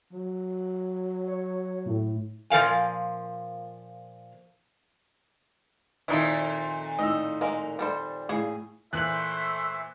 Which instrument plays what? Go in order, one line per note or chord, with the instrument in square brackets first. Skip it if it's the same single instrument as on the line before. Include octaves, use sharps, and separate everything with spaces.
[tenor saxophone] F#3
[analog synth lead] C#5
A2
[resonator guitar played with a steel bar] A#2 F3 A#4 F5 G#5
[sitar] F2 A#2 D#3 [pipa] F3 D#4 E4
[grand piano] A2 D#4 E6 [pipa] D#5
[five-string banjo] G#3 A#3 A#4
G3 A4 C5
[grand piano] A2 [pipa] C#3 [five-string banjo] G#4
[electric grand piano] A#2 E3 [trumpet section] A3 E4 C5 [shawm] E5 [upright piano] F#6 F#7